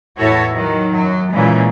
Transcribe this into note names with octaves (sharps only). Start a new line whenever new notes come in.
E2 A2 E4 F#4 A4 C#5
D#3 F#3
F#2 F#3
A#2 C#3 E3 G#3